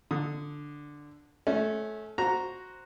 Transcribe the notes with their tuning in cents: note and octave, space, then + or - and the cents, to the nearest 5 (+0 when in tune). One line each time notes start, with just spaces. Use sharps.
D3 +0 D#6 +0
A3 -25 C#4 +0
F#4 +0 C5 +5 A#5 +0